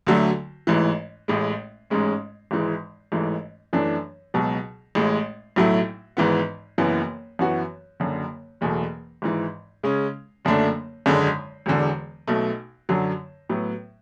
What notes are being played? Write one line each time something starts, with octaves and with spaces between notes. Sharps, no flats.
D2 D3 F#3 A3
A1 G#2 E3
A1 A2 G#3
A1 G#2 G#3 C#4
G#1 G#2 E3 G#3
A1 G#2 E3 A3
F#2 E3 A3 D4
C#2 B2 F#3
A1 A2 G#3
B1 A2 F#3 A3 E4
G#1 G#2 E3 B3
F#1 F#2 E3 B3
F#2 E3 B3 F#4
F#1 F#2 D3
F#1 E2 B2 A3
G#1 G#2 E3
C#3 G#3 C#4
F#1 F#2 D3 A3 D4
G#1 F#2 D3 G#3
E1 E2 D3
B1 B2 A3
F#2 D3 F#3
A2 F#3 B3